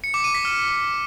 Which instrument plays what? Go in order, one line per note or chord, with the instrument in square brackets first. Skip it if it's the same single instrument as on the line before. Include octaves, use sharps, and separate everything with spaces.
[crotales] C#7
D6
D#7
B6
F6